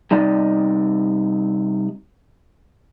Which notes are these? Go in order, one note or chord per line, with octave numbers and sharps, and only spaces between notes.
C3 G3 D#4 D5 D#5